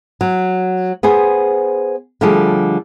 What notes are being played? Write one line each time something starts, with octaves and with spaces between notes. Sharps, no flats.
F#3
B3 G#4 C5 G#5
D3 F3 G3 A3 G4 G#4